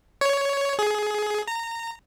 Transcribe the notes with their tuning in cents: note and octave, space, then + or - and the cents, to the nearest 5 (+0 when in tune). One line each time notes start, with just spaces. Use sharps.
C#5 +10
G#4 +20
A#5 -20